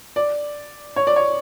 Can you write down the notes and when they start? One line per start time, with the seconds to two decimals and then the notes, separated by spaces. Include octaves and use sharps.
0.16 D5
0.96 C#5
1.07 D5
1.16 C#5